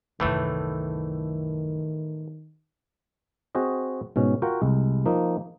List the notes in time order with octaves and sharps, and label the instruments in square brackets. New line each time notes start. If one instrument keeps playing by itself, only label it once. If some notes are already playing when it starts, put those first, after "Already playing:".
[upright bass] C2 F#2 [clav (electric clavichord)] A2 E3 A3 [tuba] D#3
[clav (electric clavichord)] C4 F#4 G#4 C5 D#5
G#2 B2 C#4
F4 F#4 A#4 F#5 G5
C2 G#3
F3 A#3 D#4